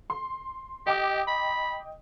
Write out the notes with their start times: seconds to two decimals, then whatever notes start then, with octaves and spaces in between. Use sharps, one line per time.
0.10 C6
0.86 G4 D#5 G5 D6
1.27 B5